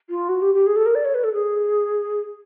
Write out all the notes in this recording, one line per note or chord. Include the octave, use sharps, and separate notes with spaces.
F4
F#4
G4
G4
G#4
A4
A#4
D5
C#5
B4
A4
G#4